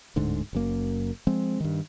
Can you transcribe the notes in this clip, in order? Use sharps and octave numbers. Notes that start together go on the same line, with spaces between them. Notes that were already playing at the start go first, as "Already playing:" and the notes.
D1 D2 G#2 D3
F#1 F#2 A#3
F3 G#3 C4
G2 D#3